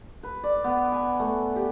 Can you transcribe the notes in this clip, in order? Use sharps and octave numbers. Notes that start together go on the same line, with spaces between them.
B4
D5
B3
G#5
A3
G4